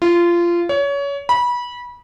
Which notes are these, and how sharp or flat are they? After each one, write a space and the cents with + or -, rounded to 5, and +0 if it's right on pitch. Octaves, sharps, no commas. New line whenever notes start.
F4 -20
C#5 +25
B5 -25